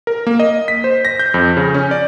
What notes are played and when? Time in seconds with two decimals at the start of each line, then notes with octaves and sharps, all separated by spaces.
0.07 A#4
0.27 A#3
0.40 D#5
0.68 B6
0.84 C5
1.05 A#6
1.19 G6
1.34 F2
1.57 C#3
1.74 C#4
1.91 D5